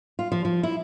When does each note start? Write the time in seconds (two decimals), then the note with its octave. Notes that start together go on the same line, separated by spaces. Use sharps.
0.19 F4
0.32 F3
0.45 F3
0.63 E4